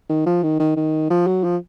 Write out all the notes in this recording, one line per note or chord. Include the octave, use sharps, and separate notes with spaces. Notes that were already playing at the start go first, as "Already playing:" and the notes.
D#3
F3
D#3
D#3
D#3
F3
F#3
F3